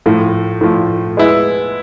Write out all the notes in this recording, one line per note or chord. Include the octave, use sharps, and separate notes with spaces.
A2 F3 A3
A2 F3 A3
G#3 B3 E4